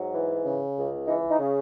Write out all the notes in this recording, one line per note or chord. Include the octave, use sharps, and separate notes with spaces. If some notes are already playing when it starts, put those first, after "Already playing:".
Already playing: G#2 F#3
E3
C#3
C#2
E3 D#4
D#4
C#3